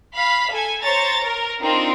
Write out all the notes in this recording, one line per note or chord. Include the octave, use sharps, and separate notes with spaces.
F5 B5 B6
A4 G#5
C5 C#5 A#5 A6
A#4
C4 D4 D#4 F4 A#4